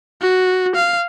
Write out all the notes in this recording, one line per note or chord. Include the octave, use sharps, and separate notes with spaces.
F#4
F5